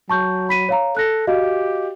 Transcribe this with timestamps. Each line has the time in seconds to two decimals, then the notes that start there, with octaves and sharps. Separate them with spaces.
0.10 F#3 A5 C#6 G6
0.49 B5 B6 D#7
0.69 C#5 F5 A#5
0.97 A4 F#6 A#6
1.27 F#4 G4 D#5 F5